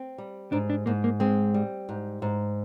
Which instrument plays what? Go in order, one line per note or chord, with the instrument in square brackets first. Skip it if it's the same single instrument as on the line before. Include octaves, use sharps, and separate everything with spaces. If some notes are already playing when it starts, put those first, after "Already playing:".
Already playing: [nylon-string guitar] C4
G3
[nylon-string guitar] G#2 [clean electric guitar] D4
[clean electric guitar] D4
[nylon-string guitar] G#2 [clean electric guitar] A#3
[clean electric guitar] A#3
[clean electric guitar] G#3 [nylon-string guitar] C4
[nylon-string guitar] G3
G#2
G#2